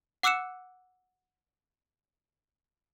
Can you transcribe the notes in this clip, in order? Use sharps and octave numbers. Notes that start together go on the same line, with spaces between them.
F#5 D6 E6 F#6 C#7 E7